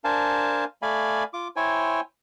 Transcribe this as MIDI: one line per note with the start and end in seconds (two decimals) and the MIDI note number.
0.04 0.65 62
0.04 0.65 70
0.04 0.65 72
0.04 0.65 77
0.04 0.65 80
0.04 0.65 81
0.82 1.24 57
0.82 1.24 74
0.82 1.24 77
0.82 1.24 80
0.82 1.24 83
1.34 1.48 65
1.34 1.48 86
1.56 2.00 64
1.56 2.00 72
1.56 2.00 73
1.56 2.00 79
1.56 2.00 80